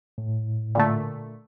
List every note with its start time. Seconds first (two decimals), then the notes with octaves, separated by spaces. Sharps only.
0.18 A2
0.75 A#2 D3 A3